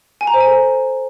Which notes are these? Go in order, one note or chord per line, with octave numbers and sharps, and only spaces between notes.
G#5
A#5
C5
G#5
A4